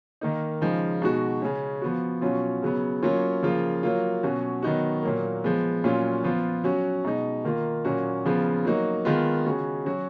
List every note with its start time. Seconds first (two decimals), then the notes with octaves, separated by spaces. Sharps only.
0.21 D#3 A#3 D#4
0.61 C#3 F3 G#3 D#4
1.02 B2 G#3 D#4 F#4
1.42 C#3 G#3 C#4
1.82 F3 B3 F#4
2.21 B2 F#3 C#4 F4
2.62 C#3 F#3 B3
3.03 F#3 A#3 C#4 F4
3.43 C#3 F3 A#3 F4
3.83 F#3 A#3 F4
4.23 B2 F#3 C#4 F#4
4.63 D#3 F#3 B3 D#4 F#4
5.03 A#2 F#3 A#3
5.44 F3 G#3 B3
5.84 A#2 F#3 C#4 F4
6.24 F3 B3 F4
6.64 F#3 C#4 F#4
7.05 B2 G#3 D#4
7.45 D#3 A#3 F4
7.85 A#2 F#3 A#3 C#4 F#4
8.25 C#3 F3 B3 F4
8.65 F#3 A#3 D#4 F#4
9.05 D#3 G#3 B3 F4
9.46 C#3 G#3 C#4 F#4
9.85 F#3 C#4 F#4